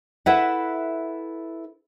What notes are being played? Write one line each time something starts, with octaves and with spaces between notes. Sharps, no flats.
E4 A4 B4 E5 F#5